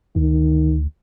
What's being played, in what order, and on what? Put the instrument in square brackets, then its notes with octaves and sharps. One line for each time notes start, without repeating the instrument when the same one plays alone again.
[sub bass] D2 [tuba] D#3